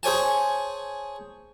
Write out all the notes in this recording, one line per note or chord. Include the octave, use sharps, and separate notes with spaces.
G#4 C5 C#5 G#5 A5